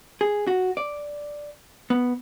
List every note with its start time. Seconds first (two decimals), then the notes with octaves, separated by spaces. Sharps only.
0.21 G#4
0.47 F#4
0.77 D5
1.90 B3